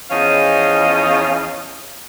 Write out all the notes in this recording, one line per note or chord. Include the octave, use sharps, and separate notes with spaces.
E2 F3 C#4 D#5 F5